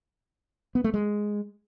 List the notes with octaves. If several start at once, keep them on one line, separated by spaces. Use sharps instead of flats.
B3
A3
G#3